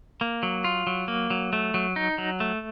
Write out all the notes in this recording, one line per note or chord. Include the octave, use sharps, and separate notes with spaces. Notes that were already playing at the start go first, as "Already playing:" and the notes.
A#3
F#3
F4
F#3
A#3
F#3
A3
F#3
D#4
F#3
A3